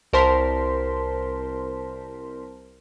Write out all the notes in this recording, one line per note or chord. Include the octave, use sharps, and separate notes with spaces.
C2 A#4 C5 A5 C6 B6